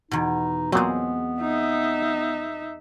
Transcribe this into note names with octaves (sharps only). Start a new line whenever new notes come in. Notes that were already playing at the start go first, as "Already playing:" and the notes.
E2 B2 D#4
A#2 F#3 G#3 B3 C4
D#4 E5